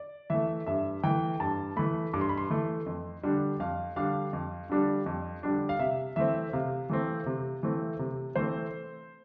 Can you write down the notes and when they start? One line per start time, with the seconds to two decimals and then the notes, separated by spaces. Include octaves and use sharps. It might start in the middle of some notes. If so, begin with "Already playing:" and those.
Already playing: D5
0.30 E3 A3 E5
0.66 G2 E5
1.03 E3 A3 G5
1.40 G2 A5
1.77 E3 A3 B5
2.13 G2 D6
2.21 C6
2.29 B5
2.38 C6
2.50 E3 A3
2.86 F2
3.23 D3 G3 D4
3.60 F2 F5
3.96 D3 G3 D4 F5
4.33 F2
4.70 D3 G3 D4
5.06 F2
5.43 D3 G3 D4
5.69 F5
5.79 C3 E5
6.16 E3 A3 C4 E5
6.53 C3 F5
6.90 E3 A3 C4
7.26 C3
7.63 E3 A3 C4
7.99 C3
8.36 E3 A3 C4 C5